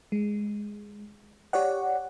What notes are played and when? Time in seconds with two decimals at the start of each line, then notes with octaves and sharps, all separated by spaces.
0.12 G#3
1.53 G4 C#5 D5 F#5